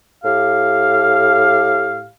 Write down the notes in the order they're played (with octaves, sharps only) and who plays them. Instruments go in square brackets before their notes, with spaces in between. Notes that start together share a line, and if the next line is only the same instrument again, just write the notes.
[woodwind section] A2 G4 F5